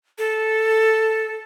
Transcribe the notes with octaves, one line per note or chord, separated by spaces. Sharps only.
A4